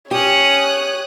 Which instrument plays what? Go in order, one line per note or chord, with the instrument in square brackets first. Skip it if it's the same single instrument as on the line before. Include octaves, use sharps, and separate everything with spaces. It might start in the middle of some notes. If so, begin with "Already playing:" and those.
[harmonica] C#4 [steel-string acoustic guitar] G4 [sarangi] C#5 [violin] D#6 F#6